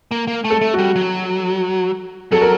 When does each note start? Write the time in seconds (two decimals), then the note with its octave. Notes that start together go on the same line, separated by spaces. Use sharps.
0.11 A#3
0.27 A#3
0.45 A3
0.50 A4
0.61 A3
0.74 G3 F#4
0.96 F#3
2.32 F#3 A4
2.42 A#4